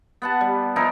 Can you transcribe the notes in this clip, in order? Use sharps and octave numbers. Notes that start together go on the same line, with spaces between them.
B3 F#5 A5
G3
F3 D#4 E4 A#4